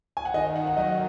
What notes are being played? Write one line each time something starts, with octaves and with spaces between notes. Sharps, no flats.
G#5
F#5
D#3 D#5
D#3 F#5
F#5
F#3 D#5